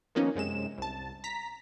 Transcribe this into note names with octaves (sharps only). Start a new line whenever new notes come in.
D#3 F3 A#3 B3 C#4 D#4
F#2 C3 G#3 E7
C2 A5
A#5 B6